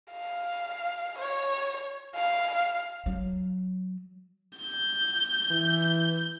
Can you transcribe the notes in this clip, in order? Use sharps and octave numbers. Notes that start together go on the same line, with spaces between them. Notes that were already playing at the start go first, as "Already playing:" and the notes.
F5
C#5
F5
F#3
G6
E3